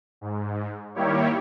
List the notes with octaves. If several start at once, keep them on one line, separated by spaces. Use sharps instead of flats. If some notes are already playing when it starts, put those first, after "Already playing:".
G#2
D#3 G3 A#3 E4 G4 C#5